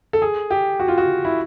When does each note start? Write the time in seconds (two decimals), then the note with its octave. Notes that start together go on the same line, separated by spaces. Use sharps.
0.13 A4
0.22 G#4
0.50 G4
0.80 F#4
0.88 F4
0.98 F#4
1.25 E4